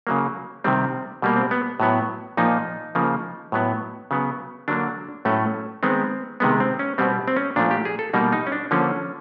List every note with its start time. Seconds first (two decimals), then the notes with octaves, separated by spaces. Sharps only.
0.07 C#3 F#3 A#3
0.64 C3 D#3 G3 C4
1.22 B2 G3 A#3
1.36 C4
1.51 B3
1.80 A2 F#3 B3
2.37 A#2 F3 A#3 D#4
2.95 C#3 F3 A#3
3.52 A2 F#3 B3
4.11 C#3 F#3 B3
4.68 D3 F#3 A#3 D4
5.25 A2 F#3 A3 C#4
5.83 D#3 G#3 B3 C4
6.40 C3 D#3 G#3 B3
6.60 C4
6.79 C#4
6.98 B2 G3 B3 C4
7.28 C4
7.36 C#4
7.56 A#2 F3 A3 D4
7.71 G4
7.85 G#4
7.99 A4
8.13 B2 G3 A#3 D#4
8.32 D#4
8.47 C#4
8.52 D4
8.71 D3 F3 A#3 C#4